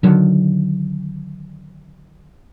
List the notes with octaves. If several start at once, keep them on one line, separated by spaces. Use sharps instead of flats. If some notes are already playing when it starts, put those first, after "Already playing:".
D3 D#3 F#3